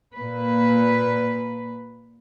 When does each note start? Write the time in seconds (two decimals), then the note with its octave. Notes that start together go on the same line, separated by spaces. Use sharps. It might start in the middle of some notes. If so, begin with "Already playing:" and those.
0.15 A#2 B4